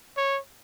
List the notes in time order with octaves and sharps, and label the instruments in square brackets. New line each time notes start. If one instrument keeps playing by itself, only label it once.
[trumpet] C#5